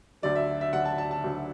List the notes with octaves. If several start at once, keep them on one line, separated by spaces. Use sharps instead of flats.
D2 D3 F#3 D5
E5
E5
D2 D3 F#3 F#5
A5
A5
A5
D2 D3 F#3